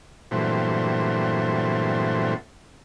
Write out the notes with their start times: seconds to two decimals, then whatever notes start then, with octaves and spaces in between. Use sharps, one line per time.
0.31 G2 A#2 E3 F#3 A3 C4